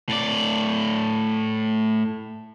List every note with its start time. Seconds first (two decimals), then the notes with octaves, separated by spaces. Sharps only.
0.09 A2 D5